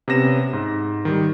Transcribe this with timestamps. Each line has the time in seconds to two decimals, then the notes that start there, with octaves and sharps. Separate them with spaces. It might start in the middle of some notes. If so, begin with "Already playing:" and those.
0.08 C3 B3 C#4 A#6 E7
0.53 G#2
1.05 D#3 G3